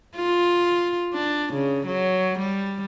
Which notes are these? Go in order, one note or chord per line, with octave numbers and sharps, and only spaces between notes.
F4
D4
C#3
F#3
G3